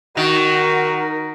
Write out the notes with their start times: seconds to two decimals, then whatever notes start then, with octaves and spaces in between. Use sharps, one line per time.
0.17 D#3 F#4 A#4